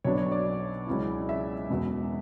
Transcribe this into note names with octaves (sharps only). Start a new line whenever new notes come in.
B1 B2 F#3 B3 D4 C#5
C#5
D5
C#2 C#3 F#3 C#4 E4
E5
E1 E2 B2